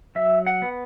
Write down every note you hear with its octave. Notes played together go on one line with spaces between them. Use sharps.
F#3 E5
F#5
B3